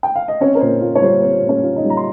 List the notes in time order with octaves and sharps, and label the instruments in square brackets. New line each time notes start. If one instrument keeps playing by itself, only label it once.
[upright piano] G5
F5
D#5
C4 C#4 C#5
A#4
A#2 C5
F4
C#5
G3 C5
C4 C5
A#2
C#4 C#5
F4
D#4 D#5
G3
A#5
C6